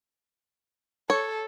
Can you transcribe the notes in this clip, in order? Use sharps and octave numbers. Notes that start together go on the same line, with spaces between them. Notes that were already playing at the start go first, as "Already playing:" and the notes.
A4 C#5